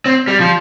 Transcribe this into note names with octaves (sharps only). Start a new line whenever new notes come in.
C4
G3
F3